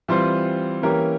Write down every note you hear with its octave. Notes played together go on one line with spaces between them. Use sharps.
E3 G3 C4 F4 C5
E3 A#3 C#4 G4 A#4